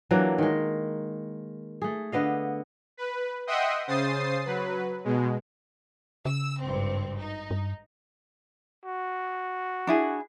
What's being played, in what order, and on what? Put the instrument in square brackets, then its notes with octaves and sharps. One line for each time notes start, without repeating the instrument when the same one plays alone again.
[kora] E3 F#3 A#3 D4
D#3 G#3
A3 G#4
D3 B3 D#5 F5
[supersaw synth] B4
D#5 E5 F#5 G5 C6 D#6
C#3 C5 D#6 A6 C7
F#3 B4
B2 G#3
[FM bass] C#3 [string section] E6
[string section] G#1 G2 C4
D#4
[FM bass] G2
[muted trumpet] F#4
[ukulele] D4 E4 G#4